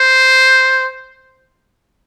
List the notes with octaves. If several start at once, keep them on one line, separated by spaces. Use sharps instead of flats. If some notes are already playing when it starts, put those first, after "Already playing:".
Already playing: C5